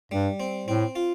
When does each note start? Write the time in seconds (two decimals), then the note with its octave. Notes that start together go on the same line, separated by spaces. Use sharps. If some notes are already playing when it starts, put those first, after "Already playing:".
0.11 G2 G3
0.40 C4
0.68 A2 C4
0.96 F4